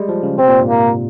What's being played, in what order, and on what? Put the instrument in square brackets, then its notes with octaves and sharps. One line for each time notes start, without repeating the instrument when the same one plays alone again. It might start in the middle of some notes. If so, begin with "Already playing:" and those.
Already playing: [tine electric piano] G3 G#3
F3
C#3
[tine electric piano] C3 [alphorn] C4
[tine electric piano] A#2
G#2
[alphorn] A#3